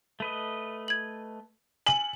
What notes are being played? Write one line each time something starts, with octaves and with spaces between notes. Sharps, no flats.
A3 B4 D#5
G#6 F#7
G#5 F#7